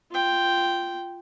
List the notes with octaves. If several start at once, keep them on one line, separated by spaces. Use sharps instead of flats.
F4 G5